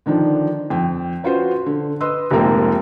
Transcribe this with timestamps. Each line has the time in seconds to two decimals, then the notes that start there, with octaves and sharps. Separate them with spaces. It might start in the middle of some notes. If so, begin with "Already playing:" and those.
0.06 D3 D#3 F3 D4
0.70 F2 G5
1.24 C#4 F4 F#4 B4 C5
1.66 D3
2.01 B4 D#5 C6 E6
2.30 F1 G#2 F3 A#3 A#4 G5